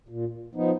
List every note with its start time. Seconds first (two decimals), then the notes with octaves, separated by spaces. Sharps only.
0.09 A#2
0.55 F3 B3 D#4